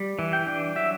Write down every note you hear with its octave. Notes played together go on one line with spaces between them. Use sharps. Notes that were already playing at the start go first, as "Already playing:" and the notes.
Already playing: G3
E3
G5
D4
F#3 E5